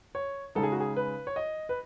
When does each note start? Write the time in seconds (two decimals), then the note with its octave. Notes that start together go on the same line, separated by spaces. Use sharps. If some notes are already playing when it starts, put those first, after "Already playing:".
0.15 C#5
0.55 C#3 G#3 D#4 A4
0.63 G#4
0.72 F#4
0.80 G#4
0.96 B4
1.27 C#5
1.36 D#5
1.69 B4